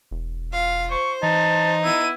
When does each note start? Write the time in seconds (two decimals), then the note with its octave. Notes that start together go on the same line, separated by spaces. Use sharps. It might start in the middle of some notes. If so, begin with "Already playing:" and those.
0.11 E1
0.52 F4 F5
0.91 C5 C#6
1.23 E3 D#4 A5
1.84 B3 E4 D#7